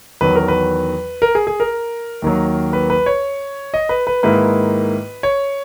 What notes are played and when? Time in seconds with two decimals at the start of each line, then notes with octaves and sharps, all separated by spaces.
0.21 E2 D#3 F#3 B4
0.35 A#4
0.48 B4
1.22 A#4
1.35 G#4
1.47 G#4
1.60 A#4
2.22 D#2 D#3 F#3
2.73 B4
2.90 B4
3.06 C#5
3.74 D#5
3.89 B4
4.07 B4
4.23 G#2 D#3 A#3 E4 B4
5.23 C#5